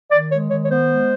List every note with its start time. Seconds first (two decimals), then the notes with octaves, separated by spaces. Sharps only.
0.11 D#3 D5
0.31 G#3 C#5
0.50 D#3 C#5
0.64 C#5
0.69 B3 C5
0.89 G#3